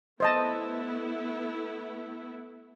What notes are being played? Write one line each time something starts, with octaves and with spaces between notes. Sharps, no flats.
A3 B3 E4 C5 D#5 A5